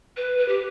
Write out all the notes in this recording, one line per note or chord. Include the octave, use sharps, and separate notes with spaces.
B4
B4
G4